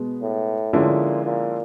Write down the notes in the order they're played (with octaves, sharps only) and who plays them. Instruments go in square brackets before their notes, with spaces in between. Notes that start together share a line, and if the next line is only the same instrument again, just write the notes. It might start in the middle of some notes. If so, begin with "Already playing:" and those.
Already playing: [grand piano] B2 G#3 B3
[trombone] A2
[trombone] A#2 [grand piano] D3 F3 G#3 C#4 E4
[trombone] A#2